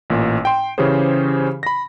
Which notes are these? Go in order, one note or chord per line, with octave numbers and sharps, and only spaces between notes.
A1 A#2
G5 C6
C#3 E3 C#4 G4 G#4 C5
B5 A#6